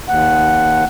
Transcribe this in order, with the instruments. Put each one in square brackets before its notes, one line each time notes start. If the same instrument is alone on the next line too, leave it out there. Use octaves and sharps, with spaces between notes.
[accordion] D#2 F#5